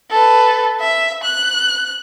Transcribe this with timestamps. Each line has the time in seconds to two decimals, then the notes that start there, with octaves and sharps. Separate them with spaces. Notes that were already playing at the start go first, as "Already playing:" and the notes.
0.10 A4 B4
0.80 E5
1.24 F#6